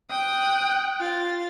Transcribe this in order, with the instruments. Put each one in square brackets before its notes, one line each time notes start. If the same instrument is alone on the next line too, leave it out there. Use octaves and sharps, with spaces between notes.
[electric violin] G5 F#6 [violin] D#6
[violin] F4 A6